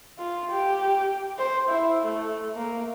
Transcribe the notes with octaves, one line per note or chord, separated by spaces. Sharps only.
F4
G4
C5
E4
A3
A#3